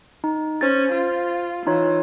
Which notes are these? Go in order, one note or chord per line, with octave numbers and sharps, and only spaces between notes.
D#4
C#4 C5 A6
F4
E3 D#4 F4 C#5